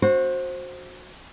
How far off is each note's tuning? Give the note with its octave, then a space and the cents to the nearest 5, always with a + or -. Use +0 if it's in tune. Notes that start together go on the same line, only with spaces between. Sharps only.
F#4 -20 C5 +15